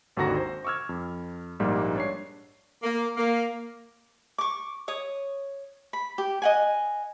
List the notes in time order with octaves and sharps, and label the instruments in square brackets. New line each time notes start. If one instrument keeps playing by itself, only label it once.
[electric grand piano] G#1 D#2 D3 F#4 A#5 A#6
C5
C#6 D6 E6 F6 G#6
F2
A#1 G#2 G3 A#3
D4 C#5 C7
[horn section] A#3
A#3
[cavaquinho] C#6 D6
C#5 D#6
B5
G4
D#5 F#5 G#5